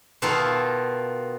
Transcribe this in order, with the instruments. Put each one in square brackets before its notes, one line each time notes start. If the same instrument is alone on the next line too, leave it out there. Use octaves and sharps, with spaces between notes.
[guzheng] B2 D#3 D#4 F4 A4